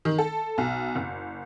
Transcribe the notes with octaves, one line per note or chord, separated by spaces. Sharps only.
D#3
A4
B1
F#1